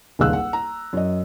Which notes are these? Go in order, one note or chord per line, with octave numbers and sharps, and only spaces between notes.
D#1 G#1 C#2 F5 E6 F#6
F#5
A#5
F#2 D#5